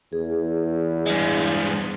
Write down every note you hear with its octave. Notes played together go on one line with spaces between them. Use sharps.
E2 G#4
G2 G#3